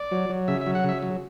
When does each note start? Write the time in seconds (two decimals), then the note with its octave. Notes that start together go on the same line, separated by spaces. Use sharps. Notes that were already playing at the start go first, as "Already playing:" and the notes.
Already playing: D5
0.11 F#3
0.29 F#3
0.48 C#3 E5
0.61 E5
0.66 F#3
0.75 F#5
0.84 C#3
0.89 E5
1.03 F#3